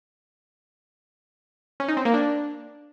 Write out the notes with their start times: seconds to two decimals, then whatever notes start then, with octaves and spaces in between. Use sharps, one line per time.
1.80 C#4
1.88 D#4
1.97 C4
2.05 A#3
2.14 D4